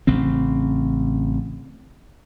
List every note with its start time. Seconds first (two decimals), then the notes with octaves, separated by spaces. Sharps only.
0.07 A1 C#3 C4